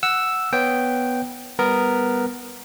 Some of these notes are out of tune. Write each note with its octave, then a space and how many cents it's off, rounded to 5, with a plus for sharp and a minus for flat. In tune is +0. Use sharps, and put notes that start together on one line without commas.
F#5 +0 E6 +0
B3 +0 C#5 +0 G5 -5
G3 +5 B3 +0 A#4 +0